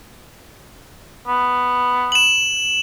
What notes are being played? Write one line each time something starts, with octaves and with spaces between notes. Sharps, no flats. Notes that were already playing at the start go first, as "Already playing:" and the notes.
B3
E7 F#7